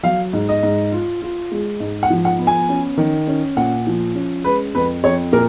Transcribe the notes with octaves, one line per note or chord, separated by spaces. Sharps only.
F#3 F5
G#2
D#5
G#2
F4
F4
G#3
G#2
F#5
F3
F#5
B3
G#5
C#4
D#3
C#4
A#2 F#5
F3
C#4
G#3 B4
F2 B4
F2 C#5
A#2 A#4